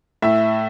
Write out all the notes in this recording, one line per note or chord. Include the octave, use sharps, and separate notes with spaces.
A2 E5